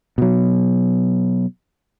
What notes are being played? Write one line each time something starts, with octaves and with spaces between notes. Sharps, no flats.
B2 F#3